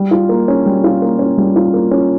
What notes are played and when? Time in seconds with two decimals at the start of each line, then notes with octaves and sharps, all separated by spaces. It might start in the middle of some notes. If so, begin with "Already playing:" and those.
Already playing: G3
0.11 F4
0.29 A#3
0.48 C#4
0.66 G3
0.84 F4
1.02 A#3
1.19 C#4
1.37 G3
1.56 F4
1.74 A#3
1.91 C#4